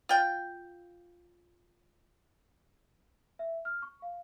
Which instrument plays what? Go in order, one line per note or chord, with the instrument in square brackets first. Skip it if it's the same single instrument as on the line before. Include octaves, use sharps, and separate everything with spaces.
[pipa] F4 G5
[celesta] E5
F6
C#6
F5